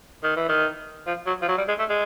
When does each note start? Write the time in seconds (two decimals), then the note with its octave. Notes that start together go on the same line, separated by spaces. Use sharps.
0.24 D#3
0.36 E3
0.49 D#3
1.07 F3
1.27 F#3
1.42 F3
1.48 F#3
1.58 G3
1.68 G#3
1.79 A3
1.90 G#3